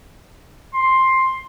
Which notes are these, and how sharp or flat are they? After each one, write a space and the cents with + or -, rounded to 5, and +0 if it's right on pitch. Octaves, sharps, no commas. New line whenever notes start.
C6 +10